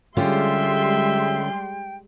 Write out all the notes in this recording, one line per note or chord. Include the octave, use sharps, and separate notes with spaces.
D3 G3 G#3 C#4 F4 E5 G5 C6